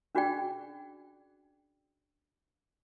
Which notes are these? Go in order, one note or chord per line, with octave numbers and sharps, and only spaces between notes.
C#4 D4 F#4 G#4 D5 G5